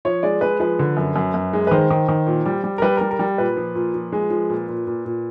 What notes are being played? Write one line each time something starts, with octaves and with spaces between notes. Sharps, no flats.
F3 C#5
G#3 D5
G#3 B4
F3 B4
D3
F#2
F#2
F#2
G#3
B4
D#3 C5
D#3
D#3
A#2
G3
G3
A#4
G3 B4
G3 A#4
A#4
G3
A#2 B4
F3
A#2
F3
G#3
F3
A#2
A#2
A#2
A#2